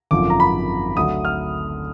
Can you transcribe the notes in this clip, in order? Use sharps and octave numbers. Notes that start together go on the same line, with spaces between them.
G#1 F#2 D3 F3 D6
A#5
B5
D2 D3 F#3 D#6
F6